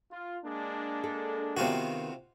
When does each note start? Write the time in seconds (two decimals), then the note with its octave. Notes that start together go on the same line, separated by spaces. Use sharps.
0.11 F4
0.44 G#3 A#3 D4
1.04 A4
1.57 C3 D#3 B3 F4 F#4